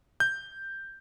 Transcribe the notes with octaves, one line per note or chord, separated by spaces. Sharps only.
G6